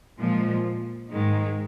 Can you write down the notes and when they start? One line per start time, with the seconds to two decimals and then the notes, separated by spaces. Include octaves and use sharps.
0.19 A#2 F3 G#3
1.12 G#2 D#3 G#3